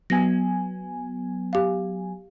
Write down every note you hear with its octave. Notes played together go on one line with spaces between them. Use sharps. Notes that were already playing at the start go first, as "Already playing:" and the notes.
F#3 B3 G#5 A#6
G4 F5